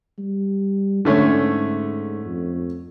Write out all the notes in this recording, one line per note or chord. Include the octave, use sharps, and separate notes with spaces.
G3
G#2 D3 A3 C#4
F2